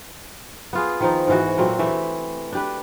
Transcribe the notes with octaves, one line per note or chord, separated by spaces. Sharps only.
B3 F4 G#4
D#3 F3 D#4
G#2 E3 F#4
A#2 F#3 A3 C4
E3 A3 G4 E5
D4 G4 B4